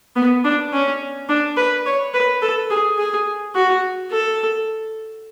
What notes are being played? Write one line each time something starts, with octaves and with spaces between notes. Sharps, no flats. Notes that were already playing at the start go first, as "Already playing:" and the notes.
B3
D4
C#4
D4
B4
C#5
B4
A4
G#4
G#4
F#4
A4